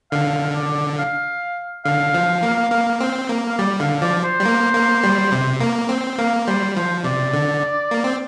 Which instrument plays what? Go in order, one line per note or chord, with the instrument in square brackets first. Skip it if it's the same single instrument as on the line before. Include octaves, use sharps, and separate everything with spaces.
[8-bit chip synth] D3 [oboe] F5
[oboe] D5
F5
[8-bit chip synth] D3 [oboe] F5
[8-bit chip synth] F3
A#3
A#3
C4
A#3
[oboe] F5
[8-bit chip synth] G3 [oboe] D5
[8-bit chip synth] D3 [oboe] F5
[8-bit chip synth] F3 [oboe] D5
[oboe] C5
[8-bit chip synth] G3
A#3
A#3
G3
C3
A#3
C4
[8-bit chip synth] A#3 [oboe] F5
[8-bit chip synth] G3 [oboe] C5
[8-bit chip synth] F3 [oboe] C5
[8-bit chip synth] C3 [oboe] D5
[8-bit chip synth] D3
A#3
C4